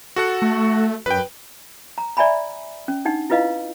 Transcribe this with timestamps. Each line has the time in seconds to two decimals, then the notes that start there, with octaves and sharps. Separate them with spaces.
0.16 F#4 A4 F#5
0.42 A3
1.06 F#2 B4 G5
1.98 A#5
2.17 D5 E5 G#5 A#5 B5
2.88 C#4
3.05 D4 D#4 F#5
3.30 E4 F4 B4 D#5 F5